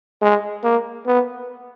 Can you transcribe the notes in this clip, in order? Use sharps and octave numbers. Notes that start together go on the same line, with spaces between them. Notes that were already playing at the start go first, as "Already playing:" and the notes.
G#3
A#3
B3